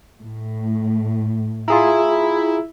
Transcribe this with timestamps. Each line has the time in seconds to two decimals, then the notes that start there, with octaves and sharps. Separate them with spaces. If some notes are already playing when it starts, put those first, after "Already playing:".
0.21 A2
1.68 E4 F4 G#4 A#5